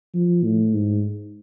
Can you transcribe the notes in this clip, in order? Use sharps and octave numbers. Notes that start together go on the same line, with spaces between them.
F3
A2
G#2